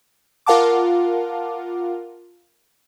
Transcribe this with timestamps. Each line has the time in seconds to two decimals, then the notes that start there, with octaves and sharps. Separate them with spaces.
0.46 F4 A#4 F5 F#5 A5 D6